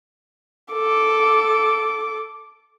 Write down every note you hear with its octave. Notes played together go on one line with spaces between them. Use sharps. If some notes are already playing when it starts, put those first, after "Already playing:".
A4 D6